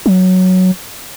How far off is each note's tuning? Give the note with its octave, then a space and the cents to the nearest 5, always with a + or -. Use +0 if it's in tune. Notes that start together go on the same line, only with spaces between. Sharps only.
F#3 +0